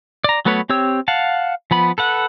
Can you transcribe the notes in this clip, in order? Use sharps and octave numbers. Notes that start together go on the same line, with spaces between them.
D5 A#5
F#3 A3 B3 B4 C#5
C4 G4 C#5 E6
F5 F#5 A5
F3 B3 B5
A4 B4 F#5